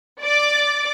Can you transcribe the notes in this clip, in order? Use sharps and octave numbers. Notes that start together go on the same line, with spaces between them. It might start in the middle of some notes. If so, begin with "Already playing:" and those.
D5 D6